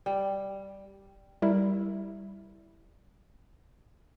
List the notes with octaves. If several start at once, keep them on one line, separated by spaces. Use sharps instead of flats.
G3
G3 E4 A#4 E5